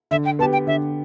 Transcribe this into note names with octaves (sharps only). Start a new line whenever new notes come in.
D3 E5
G5
B3 G4 A5
G5
D3 E5